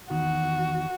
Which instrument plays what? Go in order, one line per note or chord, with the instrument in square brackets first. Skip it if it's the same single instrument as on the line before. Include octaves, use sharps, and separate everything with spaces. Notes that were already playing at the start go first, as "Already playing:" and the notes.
[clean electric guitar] E2 D#3 [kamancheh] F#4